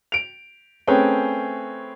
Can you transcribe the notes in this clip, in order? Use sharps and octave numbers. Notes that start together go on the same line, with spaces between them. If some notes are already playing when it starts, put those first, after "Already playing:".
D7 F7
A3 C4 C#4 G#4 B4 G5